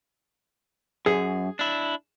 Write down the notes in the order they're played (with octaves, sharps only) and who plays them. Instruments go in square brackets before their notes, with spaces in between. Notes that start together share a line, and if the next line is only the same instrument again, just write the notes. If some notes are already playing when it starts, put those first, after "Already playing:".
[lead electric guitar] F#2 [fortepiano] G#4
[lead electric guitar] D4 E4